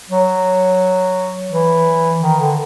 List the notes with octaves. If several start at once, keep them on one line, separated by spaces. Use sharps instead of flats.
F#3
E3
D#3
D3